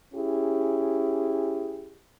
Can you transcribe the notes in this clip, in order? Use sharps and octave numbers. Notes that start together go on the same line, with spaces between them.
C#4 E4 G4 G#4